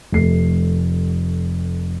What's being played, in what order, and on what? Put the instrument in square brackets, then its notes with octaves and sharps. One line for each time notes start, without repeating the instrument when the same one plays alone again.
[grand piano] F1 A3 C7